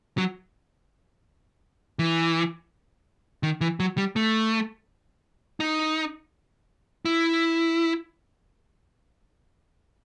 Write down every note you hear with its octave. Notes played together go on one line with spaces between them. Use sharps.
F#3
E3
D#3
E3
F#3
G3
A3
D#4
E4